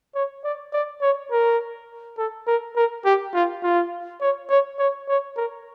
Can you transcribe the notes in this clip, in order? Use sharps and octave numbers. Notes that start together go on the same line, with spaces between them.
C#5
D5
D5
C#5
A#4
A4
A#4
A#4
G4
F4
F4
C#5
C#5
C#5
C#5
A#4